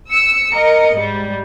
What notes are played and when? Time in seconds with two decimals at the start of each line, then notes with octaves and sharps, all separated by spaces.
0.10 E6 C#7
0.52 A#4 D#5
0.95 G#2 G3